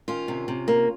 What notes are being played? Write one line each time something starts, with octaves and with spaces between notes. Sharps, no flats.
D#3 C#4 F4
C3
C3
A#3